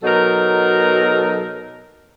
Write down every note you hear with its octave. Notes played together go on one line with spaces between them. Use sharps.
B2 F#3 D#4 A4 A#4